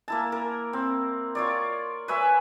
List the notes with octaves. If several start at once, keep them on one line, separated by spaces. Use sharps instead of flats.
A#3 E4 A5
A#4
C4
F4 C#5 D5
B4 C#5 E5 G#5